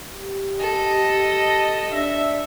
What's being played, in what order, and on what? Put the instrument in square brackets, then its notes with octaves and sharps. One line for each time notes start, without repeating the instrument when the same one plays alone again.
[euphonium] G4
[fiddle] A4 [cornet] D#5
[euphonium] D4 [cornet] E5